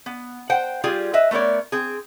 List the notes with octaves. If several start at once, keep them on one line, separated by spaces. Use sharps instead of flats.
B3
C5 F#5 G5
G3 F4 G4 G#4
B4 D#5 E5
A3 B3 A#4 C#5 D5
C4 G#4